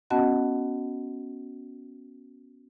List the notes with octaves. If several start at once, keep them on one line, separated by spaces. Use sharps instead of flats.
B3 C#4 F#4 D#5 F#5 A5